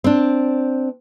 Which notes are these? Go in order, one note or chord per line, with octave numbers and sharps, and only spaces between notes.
C4 D4